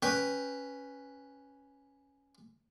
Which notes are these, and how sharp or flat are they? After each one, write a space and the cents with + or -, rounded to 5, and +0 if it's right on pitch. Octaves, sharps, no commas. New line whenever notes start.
C#4 +0 B4 +0 G5 +0